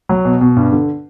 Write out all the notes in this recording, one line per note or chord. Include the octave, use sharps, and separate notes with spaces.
F#3
B2
B2
G2
D3